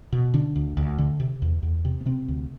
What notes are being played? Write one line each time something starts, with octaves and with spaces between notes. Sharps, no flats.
B2
D3 D4
D2
D2
D3
C3
E2
E2
C3
B3
C3 C4
D2